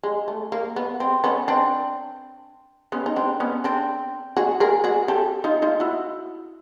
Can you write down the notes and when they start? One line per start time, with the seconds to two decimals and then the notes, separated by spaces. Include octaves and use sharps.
0.03 G#3
0.28 A3
0.52 A#3
0.76 B3
1.00 C4
1.24 B3 C#4
1.48 C4 D4
2.92 B3 C#4
3.06 D#4
3.16 C4 D4
3.40 B3 C#4
3.64 C4 D4
4.37 F#4 G#4
4.60 G#4 A#4
4.84 F#4 G#4
5.08 G4 A4
5.44 D#4 F4
5.62 D#4 F4
5.80 E4 F#4